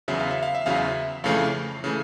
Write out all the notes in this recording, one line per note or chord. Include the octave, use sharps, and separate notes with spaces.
E2 C#3 F#3 E5
F5
E5
F5
E5
E2 C#3 F#3 F5
E5
F2 C#3 E3 A3 F5
C#3 E3 A3